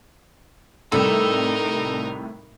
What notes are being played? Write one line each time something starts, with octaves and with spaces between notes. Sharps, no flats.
A2 C3 G3 D#4 A4 A#4